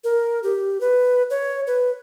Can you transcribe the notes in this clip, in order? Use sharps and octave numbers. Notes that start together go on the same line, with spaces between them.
A#4
G4
B4
C#5
B4